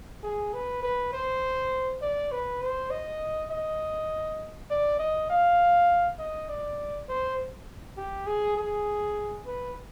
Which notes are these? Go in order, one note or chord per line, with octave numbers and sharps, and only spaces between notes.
G#4
B4
B4
C5
D5
B4
C5
D#5
D#5
D5
D#5
F5
D#5
D5
C5
G4
G#4
G#4
B4